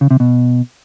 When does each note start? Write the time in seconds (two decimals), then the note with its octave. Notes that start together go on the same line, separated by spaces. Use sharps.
0.01 C#3
0.11 C3
0.20 B2